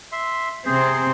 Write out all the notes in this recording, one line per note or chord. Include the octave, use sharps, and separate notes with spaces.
E5 C6
C3 C4 G#4 C5